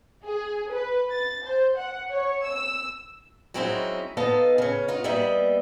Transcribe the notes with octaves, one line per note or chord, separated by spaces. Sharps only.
G#4
B4
A6
C5
F#5
C#5
E6
F#3 G#3 C4 C#4 D#4 E4
B3 D#4 A4 D#5 F5
C#3 C#4
B3 D#4 F4
G3 A#3 B3 D#5 E5